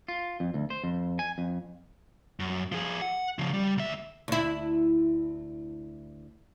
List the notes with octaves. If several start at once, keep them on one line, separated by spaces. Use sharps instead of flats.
F4
F2
D2
C5
F2
G#5
F2
F#2
F3 G#4
F#5
C#3 F3
G3
D2 E5
D2 E4